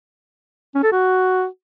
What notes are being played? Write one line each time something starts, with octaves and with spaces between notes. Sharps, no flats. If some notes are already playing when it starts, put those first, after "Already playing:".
C#4
A4
F#4